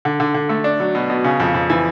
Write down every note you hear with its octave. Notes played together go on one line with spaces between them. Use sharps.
D3
D3
D3
A3
D4
F#3
B2
B2
C#3
F2
F2
E3